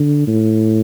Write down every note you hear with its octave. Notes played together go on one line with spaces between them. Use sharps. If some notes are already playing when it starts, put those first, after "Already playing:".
Already playing: D3
A2